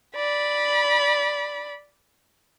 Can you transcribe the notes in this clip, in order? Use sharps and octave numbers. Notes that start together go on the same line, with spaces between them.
D5 B5